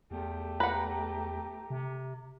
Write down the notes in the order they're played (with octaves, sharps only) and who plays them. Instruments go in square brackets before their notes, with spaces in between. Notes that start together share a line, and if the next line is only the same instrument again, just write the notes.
[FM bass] E2 [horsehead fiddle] A3 G4
[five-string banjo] B4 F#5 [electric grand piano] A#5
[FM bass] C3